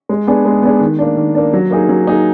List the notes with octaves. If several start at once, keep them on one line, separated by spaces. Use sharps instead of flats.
G#3
B3 D4 G#4
G#3
B3 D4 G#4
D#3
A#3 D4
D#3
A#3 D4
F#3
A#3 D#4 G#4
F#3
A#3 D#4 G#4